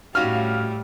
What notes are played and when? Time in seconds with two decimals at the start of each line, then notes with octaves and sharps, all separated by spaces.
0.15 A2 G3 C#4 D#4 F#4 F5 F6